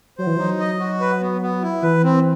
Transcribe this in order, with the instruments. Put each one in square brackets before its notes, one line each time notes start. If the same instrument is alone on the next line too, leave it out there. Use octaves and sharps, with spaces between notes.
[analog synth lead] F#3 [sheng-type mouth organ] C5
[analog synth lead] E3
[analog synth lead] F#3 [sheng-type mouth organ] D#4
[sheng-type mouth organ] D#5
F#4
B4
B3
B3
E4
[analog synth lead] E3 [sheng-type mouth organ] B4
[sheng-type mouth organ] C4